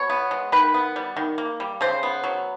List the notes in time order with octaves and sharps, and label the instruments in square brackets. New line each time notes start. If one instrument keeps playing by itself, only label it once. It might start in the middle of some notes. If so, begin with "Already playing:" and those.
Already playing: [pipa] B2 C#5
B3
G#3
D#3 B4
B3
G3
D#3
A#3
G3
C#3 C5
B3
F#3